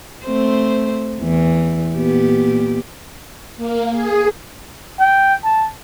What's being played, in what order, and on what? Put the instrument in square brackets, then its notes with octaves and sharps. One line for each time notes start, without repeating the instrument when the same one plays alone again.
[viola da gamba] A3 C4 C5
E2 E3
A#2 B3 G4
[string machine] A#3
G#4
[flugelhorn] G5
A5